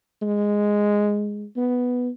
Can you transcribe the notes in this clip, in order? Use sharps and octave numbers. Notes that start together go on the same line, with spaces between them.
G#3
B3